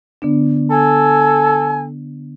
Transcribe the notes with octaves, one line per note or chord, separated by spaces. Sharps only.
D3 B3 D4
A4 G#5